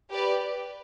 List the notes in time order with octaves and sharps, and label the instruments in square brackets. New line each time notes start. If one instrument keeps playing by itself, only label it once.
[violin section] G4 B4 D5